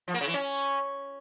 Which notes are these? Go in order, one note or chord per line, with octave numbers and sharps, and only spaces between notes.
F3
A#3
C#3
E3
C#4